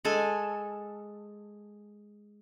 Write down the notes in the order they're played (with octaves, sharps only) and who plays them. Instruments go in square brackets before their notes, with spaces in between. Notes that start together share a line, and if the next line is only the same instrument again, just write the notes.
[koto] G#3 A4 G#5